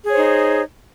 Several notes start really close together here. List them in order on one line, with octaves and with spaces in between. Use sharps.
G#4 C#5 C5 D#4